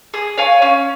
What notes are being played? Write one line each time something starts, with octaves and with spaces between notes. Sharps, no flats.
G#4
C#5 F5 G#5
C#4